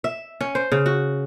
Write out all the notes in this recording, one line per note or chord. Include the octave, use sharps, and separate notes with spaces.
E5
C#4
C5
C#3
F#4